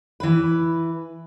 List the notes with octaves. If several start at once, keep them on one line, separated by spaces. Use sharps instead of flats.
E3 B4